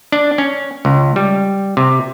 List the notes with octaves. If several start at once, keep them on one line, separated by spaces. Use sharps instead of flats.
D4
C#4
C#2
G3
C3